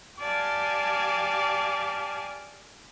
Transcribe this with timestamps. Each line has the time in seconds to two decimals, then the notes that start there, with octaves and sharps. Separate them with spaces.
0.19 G4 D5 F5 G#5 A5